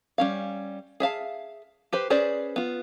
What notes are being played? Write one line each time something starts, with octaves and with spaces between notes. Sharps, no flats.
G3 C#4 F5
G#4 E5 F5 A5
G4 B4 C5
C#4 G#4 B4 C5 D5
B3 F4